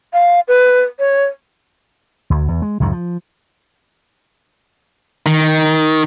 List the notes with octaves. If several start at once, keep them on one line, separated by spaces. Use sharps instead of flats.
F5
B4
C#5
D2
E2
G#3
C#2 F#2 A2 D#3
F3
D#3